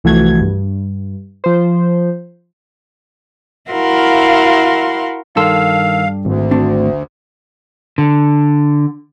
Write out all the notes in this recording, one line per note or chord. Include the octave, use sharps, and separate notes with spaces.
C2 E3 F3 A3 F#4 G#6
G2
F3 C5
E4 F#4 A#4 F5 C6
G2 D#3 A4 F5 C6 E6
G#1 D2
A3 C4 D4
D3